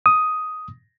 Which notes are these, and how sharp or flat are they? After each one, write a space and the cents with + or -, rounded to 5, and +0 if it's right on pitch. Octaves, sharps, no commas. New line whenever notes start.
D#6 +5